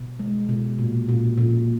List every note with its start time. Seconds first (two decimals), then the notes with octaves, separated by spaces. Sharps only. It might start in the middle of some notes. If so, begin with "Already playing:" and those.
Already playing: B2
0.19 G#3
0.49 B2
0.79 A#2
1.09 A#2
1.37 A#2